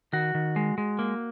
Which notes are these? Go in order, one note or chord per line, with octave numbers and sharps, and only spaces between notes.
D#3 F#4
D#3
G#3
G#3
A#3